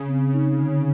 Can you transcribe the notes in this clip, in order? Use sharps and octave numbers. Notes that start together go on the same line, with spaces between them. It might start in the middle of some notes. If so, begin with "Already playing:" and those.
Already playing: C#3
C4
D#4
D3